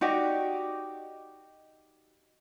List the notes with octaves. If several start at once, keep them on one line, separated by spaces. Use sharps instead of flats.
D#4 F#4 G4 D5